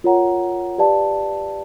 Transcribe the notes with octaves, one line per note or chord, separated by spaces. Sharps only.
F4 A#4 C#5 F#5 A#5
G4 B4 D5 F5 A5